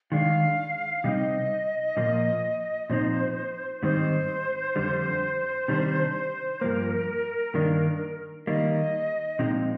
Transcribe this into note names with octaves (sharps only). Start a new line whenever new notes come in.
D#3 G#3 D4 F5
C3 G3 C4 D#4 D#5
A#2 F3 A#3
A#2 F3 C4 D#4 C5
G#2 D#3 G3 C4 D#4 C5
F2 D3 G3
C3 D#3 G3 D4
G2 F3 A#3 A#4
G2 D#3 A#3 D4
D#3 G3 A#3 D#5
A#2 F3 G#3 C4 D#4